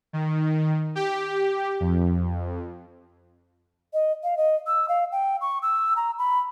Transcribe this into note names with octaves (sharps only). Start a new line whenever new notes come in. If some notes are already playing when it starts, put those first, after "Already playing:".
D#3
G4
F2
D#5
F5
D#5
E6
F5
G5
C#6
E6
A#5
B5